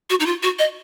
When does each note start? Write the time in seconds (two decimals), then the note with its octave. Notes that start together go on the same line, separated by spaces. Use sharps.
0.10 F#4
0.20 D#4
0.26 F4
0.43 F#4
0.59 D#5